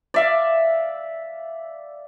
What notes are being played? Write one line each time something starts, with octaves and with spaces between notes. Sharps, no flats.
D5 E5 F5